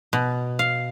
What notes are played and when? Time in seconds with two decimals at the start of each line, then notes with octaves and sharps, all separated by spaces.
0.13 B2
0.59 F5